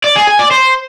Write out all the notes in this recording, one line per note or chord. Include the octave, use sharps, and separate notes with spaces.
D5
G#4
G#5
D5
C5